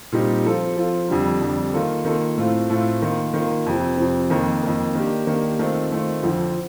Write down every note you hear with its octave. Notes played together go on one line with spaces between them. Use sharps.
A#2 G3 C4 D#4 G4
F3 C4 F4 A4
F3 C4 F4 A4
F2 D3 G3 D4
F2 D3 G3 D4
D#3 A#3 F4 A4
D#3 A#3 F4 A4
A2 A3 C4 F4
A2 A3 C4 F4
D#3 A#3 F4
D#3 A#3 F4
F2 C3 F3
F2 C3 F3
F2 D#3 A#3
F2 D#3 A#3
D#3 A#3 D4 G4
D#3 A#3 D4 G4
D#3 A3 C4 F4
D#3 A3 C4 F4
F2 D3 F3 C4